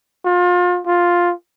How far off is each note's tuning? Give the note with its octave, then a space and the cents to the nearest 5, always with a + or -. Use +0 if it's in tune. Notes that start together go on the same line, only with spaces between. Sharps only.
F4 +30
F4 +5